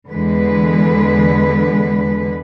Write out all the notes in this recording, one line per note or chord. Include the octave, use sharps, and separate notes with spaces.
E2 D3 G#3 B4